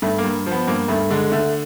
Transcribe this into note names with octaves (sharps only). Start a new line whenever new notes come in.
G2 A3
A#3
G2
F3 B3
G2 A#3
G2 A3
D3 G#3
D3 A3